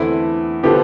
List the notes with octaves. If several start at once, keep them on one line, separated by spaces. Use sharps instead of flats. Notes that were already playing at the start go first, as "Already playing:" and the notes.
Already playing: E2 D3 A3 C4 E4
D3 F3 B3 G4